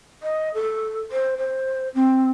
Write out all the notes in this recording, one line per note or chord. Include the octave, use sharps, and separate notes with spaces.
D#5
A4
C5
C5
C4